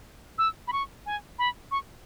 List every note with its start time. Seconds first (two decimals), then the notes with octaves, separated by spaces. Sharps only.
0.38 E6
0.68 B5
0.73 C#6
1.06 G#5
1.39 B5
1.71 C#6